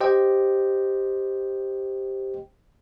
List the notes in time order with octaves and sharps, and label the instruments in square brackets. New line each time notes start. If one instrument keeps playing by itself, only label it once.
[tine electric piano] G4 C5 D#5 G5